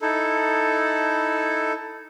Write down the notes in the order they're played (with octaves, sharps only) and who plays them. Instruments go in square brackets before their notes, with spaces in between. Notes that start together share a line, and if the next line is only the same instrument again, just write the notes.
[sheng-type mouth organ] D#4 E4 A4